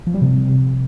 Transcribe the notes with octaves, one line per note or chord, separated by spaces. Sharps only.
F3
G3
C3